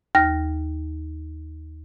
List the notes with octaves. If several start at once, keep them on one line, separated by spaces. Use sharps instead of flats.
D#2 F6 A#6